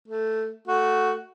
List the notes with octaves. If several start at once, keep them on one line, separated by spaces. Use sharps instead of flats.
A3
A3 F#4